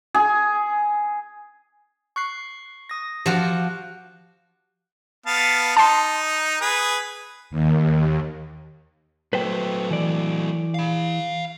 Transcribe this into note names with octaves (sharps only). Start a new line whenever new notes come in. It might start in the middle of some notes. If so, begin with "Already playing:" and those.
G#4
C#6 F#6 C7
D#6 A#6
F3 F#4 G4
B3 F5 A5
D#4 A5 C6
G#4 B4
D#2
F#3 A3 B4 C5 G5
E3 D5
F5 B5